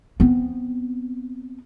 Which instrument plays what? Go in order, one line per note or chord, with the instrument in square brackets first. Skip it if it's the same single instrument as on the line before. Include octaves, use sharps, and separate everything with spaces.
[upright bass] B3 C4